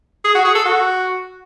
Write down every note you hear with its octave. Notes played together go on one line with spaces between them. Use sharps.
G#4
F#4
G#4
A4
F#4